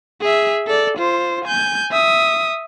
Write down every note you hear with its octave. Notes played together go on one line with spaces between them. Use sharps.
G#4 E5
A4 D5
F4 C5
G#5 G6
E5 D#6